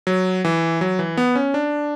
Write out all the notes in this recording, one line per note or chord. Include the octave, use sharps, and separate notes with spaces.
F#3
E3
F#3
E3
B3
C#4
D4